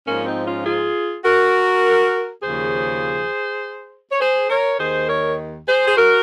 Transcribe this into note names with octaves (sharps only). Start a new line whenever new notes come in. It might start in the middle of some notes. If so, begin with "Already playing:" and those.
G#2 F3 A#3 C#4
C4 D#4
C#4 F4
F4 G#4
F#4 A#4
D#2 C#3 F3 G#4 C5
C#5
G#4 C5
A#4 C#5
D#2 D#3 G#4 C5
A#4 C#5
G#4 C5
G#4
F#4 A#4